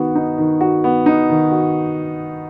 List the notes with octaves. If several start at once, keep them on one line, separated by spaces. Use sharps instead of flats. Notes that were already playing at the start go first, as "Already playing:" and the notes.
Already playing: D#3 B3 F#4
D#4
D#3
F#4
B3
D#4
D#3
F#4